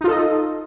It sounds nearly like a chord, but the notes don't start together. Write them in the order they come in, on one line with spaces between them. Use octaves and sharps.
D#4 F4 A4 D#5